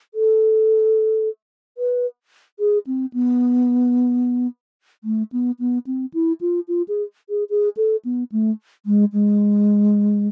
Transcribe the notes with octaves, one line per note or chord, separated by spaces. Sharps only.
A4
B4
G#4
C4
B3
A3
B3
B3
C4
E4
F4
F4
G#4
G#4
G#4
A4
B3
A3
G#3
G#3